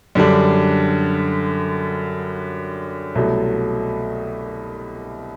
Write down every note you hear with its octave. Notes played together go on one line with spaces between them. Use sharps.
F#2 D3 G3 D4
C2 B2 F#3 A3